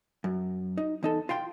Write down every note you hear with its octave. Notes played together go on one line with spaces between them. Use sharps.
F#2
D#4
E2 D#4 A4
F4 F5 G5 C6